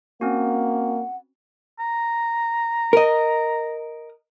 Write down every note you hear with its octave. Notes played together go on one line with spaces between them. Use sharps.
A#3 C4 C#4 F#4 F#5
A#5
A#4 D#5